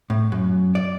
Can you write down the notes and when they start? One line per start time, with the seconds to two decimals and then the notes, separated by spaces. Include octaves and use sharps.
0.10 A2
0.32 F#2
0.75 D5